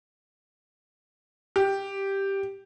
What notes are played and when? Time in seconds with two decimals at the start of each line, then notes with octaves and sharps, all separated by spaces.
1.56 G4